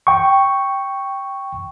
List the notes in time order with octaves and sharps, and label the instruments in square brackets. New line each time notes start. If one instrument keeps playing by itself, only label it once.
[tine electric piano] G5 C#6